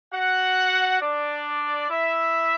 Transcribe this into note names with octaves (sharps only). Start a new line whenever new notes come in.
F#4 F#5
D4 D5
E4 E5